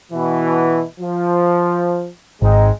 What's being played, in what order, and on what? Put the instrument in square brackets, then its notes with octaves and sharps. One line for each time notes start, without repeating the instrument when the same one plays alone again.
[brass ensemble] B2 E3
F3
[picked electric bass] G#1 [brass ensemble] G#3 C4 D#4